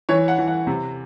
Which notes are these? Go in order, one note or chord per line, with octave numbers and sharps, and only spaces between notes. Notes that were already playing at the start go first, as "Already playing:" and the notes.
E3 C#5
F#5
E3
F#5
C3